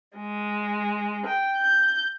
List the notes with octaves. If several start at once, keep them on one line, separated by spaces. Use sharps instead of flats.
G#3
G5
G6